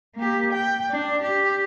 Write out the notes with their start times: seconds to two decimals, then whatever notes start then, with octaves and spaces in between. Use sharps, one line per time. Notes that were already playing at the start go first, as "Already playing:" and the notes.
0.15 A#3 G4
0.53 G5
0.91 D4
1.22 G4